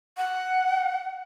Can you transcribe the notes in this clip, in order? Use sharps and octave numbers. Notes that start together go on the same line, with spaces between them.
F#5